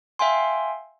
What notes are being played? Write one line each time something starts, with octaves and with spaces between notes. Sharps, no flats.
E5 F5 G5 G#5 C6